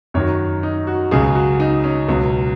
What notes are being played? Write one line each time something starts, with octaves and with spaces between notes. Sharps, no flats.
F#2 D#3 F#3 C#5
D#4
F#4
C#2 C#3 F#3 G#4
F#4
D#4
C#4
C#2 B2 F#3